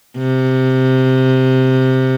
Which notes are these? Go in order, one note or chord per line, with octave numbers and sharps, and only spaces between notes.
C3